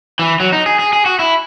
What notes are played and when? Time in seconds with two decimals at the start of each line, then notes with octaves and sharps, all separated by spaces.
0.19 E3
0.40 F#3
0.52 D#4
0.66 G#4
0.79 G#4
0.93 G#4
1.06 F#4
1.19 E4